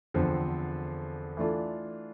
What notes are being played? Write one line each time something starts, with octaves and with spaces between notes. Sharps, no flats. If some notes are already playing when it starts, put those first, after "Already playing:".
E2 D3 F3 C4
E3 A3 D4 F4 A4